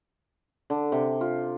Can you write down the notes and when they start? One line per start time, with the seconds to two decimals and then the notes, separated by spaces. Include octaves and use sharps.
0.70 D3
0.92 C3
1.21 F4